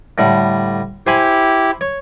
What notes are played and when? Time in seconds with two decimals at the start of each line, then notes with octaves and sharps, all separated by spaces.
0.18 A2 D3 G3
1.07 E4 G4 C5 G#5 B5
1.81 C#5